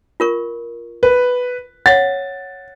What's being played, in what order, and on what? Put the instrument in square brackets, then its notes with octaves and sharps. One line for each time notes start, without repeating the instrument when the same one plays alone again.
[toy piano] F4 A#4 C#6
[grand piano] B4
[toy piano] C#5 F5 F#5 [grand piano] A6